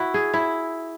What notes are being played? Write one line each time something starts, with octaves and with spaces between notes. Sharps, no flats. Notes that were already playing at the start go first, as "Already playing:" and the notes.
Already playing: E4 F#4
G#4
E4